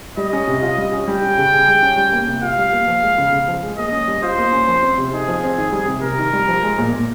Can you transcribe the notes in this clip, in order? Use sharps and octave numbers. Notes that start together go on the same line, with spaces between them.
G3 D#5
C#4
C3
F4
G3
C#4
G3 G5
C#4
C#3
G#4
G3
C#4
G3
A#3
C3
F4 F5
G3
A#3
F3
G#3
C#3
C#3
F3
G#3
A#3 D#5
C#4
G3
F4 C5
A#3
C#4
F3
C4
C3
D#4 G#4
F3
C4
D#3
G3
C3
C3 A#4
D#3
G3
F3
G#3
A#2
A#2